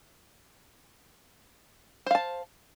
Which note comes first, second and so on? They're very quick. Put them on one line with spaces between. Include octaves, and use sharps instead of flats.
C5 F5 A5